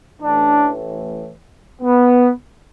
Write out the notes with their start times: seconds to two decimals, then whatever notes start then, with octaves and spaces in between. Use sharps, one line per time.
0.21 A1 A2 E3 D4
1.82 B3